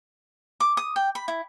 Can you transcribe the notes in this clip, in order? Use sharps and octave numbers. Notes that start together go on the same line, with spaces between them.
D6
D#6
G5
B5
E4